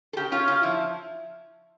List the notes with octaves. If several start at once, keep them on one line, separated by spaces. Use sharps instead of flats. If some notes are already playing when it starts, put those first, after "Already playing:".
A4
C#3 G4
C#4 F4
C#3 F4
F3 E4